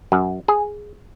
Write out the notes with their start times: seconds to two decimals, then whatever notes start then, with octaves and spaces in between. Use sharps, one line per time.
0.12 F#2
0.48 G#4